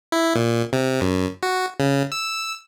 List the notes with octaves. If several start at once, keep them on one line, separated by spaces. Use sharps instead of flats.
E4
A#2
C3
F#2
F#4
C#3
E6